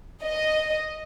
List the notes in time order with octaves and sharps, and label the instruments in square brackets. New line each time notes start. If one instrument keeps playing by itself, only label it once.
[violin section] D#5